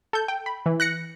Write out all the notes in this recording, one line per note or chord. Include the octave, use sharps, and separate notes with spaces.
A4 G6
G5
B5
E3
F#6 A#6 C#7